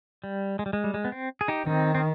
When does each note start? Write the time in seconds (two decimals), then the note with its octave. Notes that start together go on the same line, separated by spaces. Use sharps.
0.24 G3
0.59 G#3
0.66 G3
0.73 G#3
0.84 G3
0.94 G#3
1.05 B3
1.12 C4
1.41 G#4
1.48 D#4 G4
1.66 D#3 C4 D#4
1.95 C4